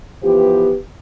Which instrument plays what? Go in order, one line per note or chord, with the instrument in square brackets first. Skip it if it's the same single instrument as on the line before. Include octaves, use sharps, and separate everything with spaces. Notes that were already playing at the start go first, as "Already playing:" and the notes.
[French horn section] E3 F3 B3 G4